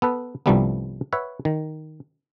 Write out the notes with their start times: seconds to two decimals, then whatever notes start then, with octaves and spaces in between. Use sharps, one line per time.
0.02 B3 A4 B4
0.46 C2 G2 F3 G3 A3 B3
1.13 B4 C#5 E5 F#5
1.45 D#3